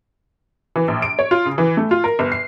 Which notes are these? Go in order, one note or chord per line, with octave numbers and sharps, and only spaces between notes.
E3
A#1
D7
C#5
F4
C#3
E3
A3
F4
A#4
G1
C7